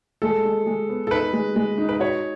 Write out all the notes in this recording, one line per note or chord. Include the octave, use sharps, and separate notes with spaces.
G#3 A4
G#3
G#3
B3
A4
D#4 B4
G#3
G#3
D#4
B4
F#4 C#5